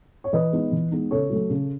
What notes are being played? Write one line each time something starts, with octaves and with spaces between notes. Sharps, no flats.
C#5
E3 B4 D#5
G#3 B3 D#4
E3
G#3 B3 D#4
C#3 A4 C#5
F#3 A3
C#3